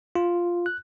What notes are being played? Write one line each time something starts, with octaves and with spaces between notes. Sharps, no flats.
F4
F#6